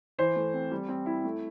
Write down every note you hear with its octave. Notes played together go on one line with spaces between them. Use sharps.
E3 C5
A3
C4
G3
C4
E4
A3